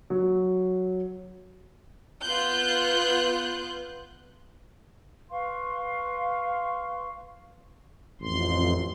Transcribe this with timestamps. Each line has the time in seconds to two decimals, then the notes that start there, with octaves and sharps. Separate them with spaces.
0.10 F#3
2.22 B3 F4 F#6 G6
5.29 B4 F5 C6 C#6
8.21 A1 F2 C6